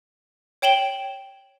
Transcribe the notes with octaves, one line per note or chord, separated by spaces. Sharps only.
C#5 G5 E7 F#7 G7